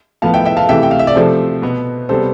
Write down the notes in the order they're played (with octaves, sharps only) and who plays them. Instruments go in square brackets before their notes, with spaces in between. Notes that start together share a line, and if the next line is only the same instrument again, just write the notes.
[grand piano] A2 F3 B3 F5 A5
E5 G5
E5 G5
F5 A5
C3 E3 A3 E5 G5
G5
F5
E5
D5
C3 F3 A3 A4 C5
B2 B3
C3 G3 B3 A4 C5